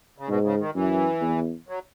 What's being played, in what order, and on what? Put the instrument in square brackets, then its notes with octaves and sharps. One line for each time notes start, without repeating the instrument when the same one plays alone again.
[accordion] C#3
[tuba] G#2 [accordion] B2
[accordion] C#3
D#3
[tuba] F#2 [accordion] E3
[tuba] E2
[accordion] F#3